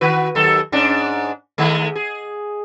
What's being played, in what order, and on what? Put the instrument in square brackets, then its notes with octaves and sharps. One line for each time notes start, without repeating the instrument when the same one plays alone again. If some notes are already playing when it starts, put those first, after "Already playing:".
[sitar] D#3 F#4 B4
D#2 F#3 A4
G#2 C#4 D4
D#3 G#3 A3
G#4